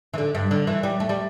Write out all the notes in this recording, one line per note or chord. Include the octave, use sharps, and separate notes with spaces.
E3
D3
G2
D3
E3
G3
A3
G3